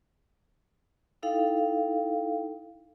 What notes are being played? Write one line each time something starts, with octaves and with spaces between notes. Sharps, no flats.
D#4 E4 A4 F5 G5